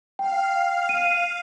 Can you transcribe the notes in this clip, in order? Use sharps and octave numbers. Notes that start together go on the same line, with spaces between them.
F5 G5
D#7